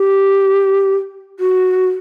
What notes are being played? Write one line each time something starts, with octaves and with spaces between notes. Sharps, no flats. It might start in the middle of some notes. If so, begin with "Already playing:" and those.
Already playing: G4
F#4